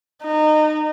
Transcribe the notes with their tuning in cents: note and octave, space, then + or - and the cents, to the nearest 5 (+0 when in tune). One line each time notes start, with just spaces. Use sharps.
D#4 -25